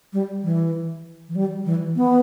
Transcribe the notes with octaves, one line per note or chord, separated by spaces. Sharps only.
G3
E3
E3
G3
E3
B3